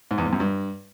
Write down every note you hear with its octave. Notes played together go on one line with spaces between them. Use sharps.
G#2
E2
G#2
F#2
G2